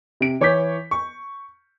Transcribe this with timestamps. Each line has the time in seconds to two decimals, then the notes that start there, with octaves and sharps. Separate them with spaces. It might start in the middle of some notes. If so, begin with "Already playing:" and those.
0.21 C3 D7
0.41 E3 C#5 C#6 D6 G6 B6
0.91 C#6